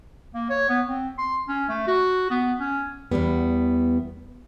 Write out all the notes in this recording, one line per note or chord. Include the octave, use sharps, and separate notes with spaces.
A#3
C#5
B3
C4
C6
C#4
A3
F#4
B3
C#4
E2 G#2 G3 B3